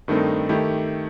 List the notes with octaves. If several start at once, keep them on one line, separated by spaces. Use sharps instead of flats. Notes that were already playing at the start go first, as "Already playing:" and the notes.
G2 D#3 A3 C4 D#4
D#3 A3 E4 G4